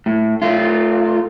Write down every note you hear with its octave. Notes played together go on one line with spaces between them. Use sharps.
A2
A3 F4